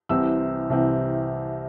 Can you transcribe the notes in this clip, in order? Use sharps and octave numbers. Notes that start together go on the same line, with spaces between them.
C2 C3 E3 C4 E6
C2 C3 E3 C4